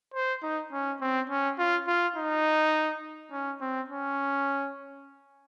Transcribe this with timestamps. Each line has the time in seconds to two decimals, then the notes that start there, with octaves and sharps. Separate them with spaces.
0.14 C5
0.43 D#4
0.72 C#4
1.01 C4
1.30 C#4
1.58 F4
1.87 F4
2.16 D#4
3.32 C#4
3.61 C4
3.90 C#4